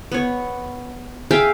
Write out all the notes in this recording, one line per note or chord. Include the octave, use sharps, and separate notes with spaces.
B3 C#5
G#4 E5 F5 G5